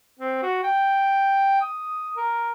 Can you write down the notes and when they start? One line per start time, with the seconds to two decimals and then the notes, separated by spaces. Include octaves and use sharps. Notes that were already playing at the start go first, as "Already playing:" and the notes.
0.19 C4
0.43 F#4
0.64 G5
1.62 D#6
2.17 A#4